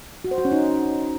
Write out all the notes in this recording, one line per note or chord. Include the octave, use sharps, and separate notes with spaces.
F#4
C5
F#4
C#4
D#4